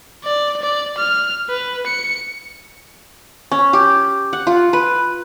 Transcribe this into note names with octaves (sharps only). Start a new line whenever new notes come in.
D5
D5
F6
B4
C#7
C#4
G4
F#5
F4
B4